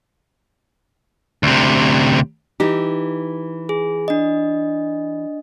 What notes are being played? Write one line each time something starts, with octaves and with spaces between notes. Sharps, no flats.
D2 C3
E3 D#4 G4
G#4
D4 D#5